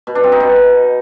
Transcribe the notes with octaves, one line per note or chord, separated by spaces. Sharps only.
B2
D4
C4
D#4
B2